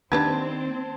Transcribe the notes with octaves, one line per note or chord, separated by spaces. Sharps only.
D#3 A#3 C4 D4 G4 B4 A5 G#6